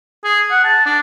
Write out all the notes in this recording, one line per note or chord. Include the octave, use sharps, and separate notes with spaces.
G#4
F#5
A5
D4